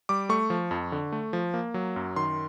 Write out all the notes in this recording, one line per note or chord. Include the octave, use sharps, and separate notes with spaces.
G3 D6
A3 C#6
F3
F2
D3
A3
F3
A#3
F#3
F#2
D#3 C6